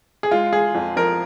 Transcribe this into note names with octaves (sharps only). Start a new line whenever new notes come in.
G#4
G#3 F4
G#3 G#4
F2
F3 A#4